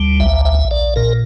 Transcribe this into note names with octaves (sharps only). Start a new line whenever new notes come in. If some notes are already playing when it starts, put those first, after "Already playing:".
Already playing: D2 G3
A#1 E5
E5
A#1
D5
A#2 A#4